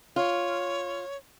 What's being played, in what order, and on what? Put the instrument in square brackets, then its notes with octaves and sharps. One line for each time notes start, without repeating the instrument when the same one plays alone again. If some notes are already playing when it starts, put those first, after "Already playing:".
[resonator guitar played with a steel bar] F4 [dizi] C#5